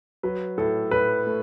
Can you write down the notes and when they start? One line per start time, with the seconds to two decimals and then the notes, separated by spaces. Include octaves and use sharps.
0.23 F#3 B4
0.57 A2 A4
0.91 A2 B4
1.27 A3